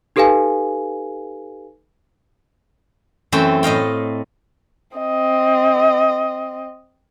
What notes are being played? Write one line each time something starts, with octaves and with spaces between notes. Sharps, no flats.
D#4 G4 A4 B4 F5 G#5
F#2 E3 A3 C4 C5 G5
A2 D#5 F5 G5
C4 D#5